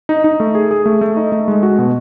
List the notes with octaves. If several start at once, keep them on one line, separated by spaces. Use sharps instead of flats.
D#4
D#4
A3
G#4
G#4
A3
A3
D#4
A3
G#3
F#4
B2